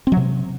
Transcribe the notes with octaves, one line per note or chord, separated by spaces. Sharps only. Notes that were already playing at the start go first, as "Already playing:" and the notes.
C4
F#3
C3